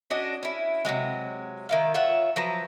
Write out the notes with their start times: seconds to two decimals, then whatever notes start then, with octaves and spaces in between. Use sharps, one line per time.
0.10 C#4 D4 F#4 D#5
0.43 C#4 E4
0.85 C3 E3 F#3 G#3
1.69 D#3 E4 F5
1.94 F4 C#5 E5 F#5
2.36 F3 F#3 B4 A#5